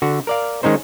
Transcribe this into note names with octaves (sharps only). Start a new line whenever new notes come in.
D3 F#4
A#4 D5 F5
D#3 G#3 C#4 D#4 C5